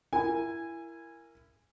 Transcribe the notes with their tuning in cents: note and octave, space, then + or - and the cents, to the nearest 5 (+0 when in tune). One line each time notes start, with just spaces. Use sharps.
E4 +25 A#4 +0 G#5 -15